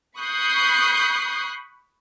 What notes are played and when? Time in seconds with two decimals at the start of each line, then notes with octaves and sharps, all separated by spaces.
0.19 B5 C#6 D#6 F#6 G6 C7